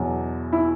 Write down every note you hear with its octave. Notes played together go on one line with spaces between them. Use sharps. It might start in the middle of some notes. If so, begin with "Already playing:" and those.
Already playing: E2 B2 F#3
E4